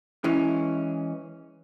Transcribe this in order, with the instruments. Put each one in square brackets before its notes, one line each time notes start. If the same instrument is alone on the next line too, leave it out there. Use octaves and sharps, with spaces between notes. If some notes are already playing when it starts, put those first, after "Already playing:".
[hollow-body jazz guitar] E3 G#3 C#4